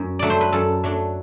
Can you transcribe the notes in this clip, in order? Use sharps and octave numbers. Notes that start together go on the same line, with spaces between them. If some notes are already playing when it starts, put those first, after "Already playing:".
Already playing: F#2
F#3 A3 D4 D5
C5
B4
F#2 A4
F#3 A3 D4